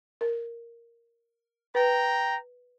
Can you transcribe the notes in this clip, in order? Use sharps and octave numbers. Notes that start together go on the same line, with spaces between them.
A#4
B4 G5 A#5